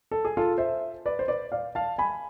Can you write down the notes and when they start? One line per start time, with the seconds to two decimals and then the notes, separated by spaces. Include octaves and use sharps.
0.11 A4
0.25 G#4
0.37 F4 A4
0.58 C5 E5
1.05 B4 D5
1.19 C5
1.28 B4 D5
1.52 D5 F5
1.75 F5 A5
1.98 G#5 B5